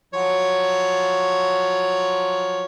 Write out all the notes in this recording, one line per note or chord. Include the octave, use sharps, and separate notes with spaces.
F3 F#3 C#5